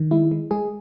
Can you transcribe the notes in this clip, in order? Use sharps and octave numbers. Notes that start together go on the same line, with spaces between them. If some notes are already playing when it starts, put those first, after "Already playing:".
Already playing: D#3
G#3 E4
G#3
G#3 G#4